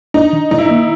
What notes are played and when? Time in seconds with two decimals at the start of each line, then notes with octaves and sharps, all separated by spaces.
0.14 D4 D#4
0.33 D#3
0.51 D#3 D#4
0.58 E4
0.66 A#3 D#4